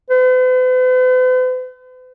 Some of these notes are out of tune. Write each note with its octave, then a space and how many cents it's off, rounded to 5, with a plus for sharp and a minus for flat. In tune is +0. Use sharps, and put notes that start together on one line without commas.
B4 +45